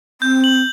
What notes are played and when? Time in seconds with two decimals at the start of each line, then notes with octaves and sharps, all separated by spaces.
0.21 C4 G6
0.44 F#7